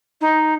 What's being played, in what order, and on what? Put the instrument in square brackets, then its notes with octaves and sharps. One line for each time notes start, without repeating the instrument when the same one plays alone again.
[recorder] D#4